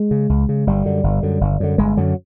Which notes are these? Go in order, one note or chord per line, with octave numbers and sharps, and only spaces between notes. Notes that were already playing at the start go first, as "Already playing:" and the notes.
Already playing: G#3
C#3
C#2
C#3
G1 G3
F#2 D3
G1
F#2 D3
G1
F#2 D3
G1 G#3
F#2 D3 F#3